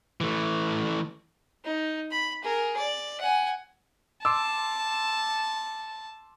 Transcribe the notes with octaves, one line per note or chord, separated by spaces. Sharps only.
E3 A3
D#4
B5
G#4 A#4
D5
F#5 G#5
A5 C6 D6 E6